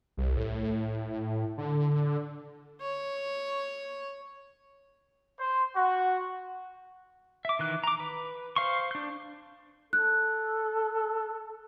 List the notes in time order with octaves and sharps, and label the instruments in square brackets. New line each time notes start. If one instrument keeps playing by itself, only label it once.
[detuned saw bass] C2
A2
D3
[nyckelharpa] C#5
[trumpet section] C5
F#4
[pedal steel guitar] E5 D6
D#3 E3 F#6
A#5 D6
B4
C5 F5 C6 C#6
D4 G6
[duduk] A4 [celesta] F#6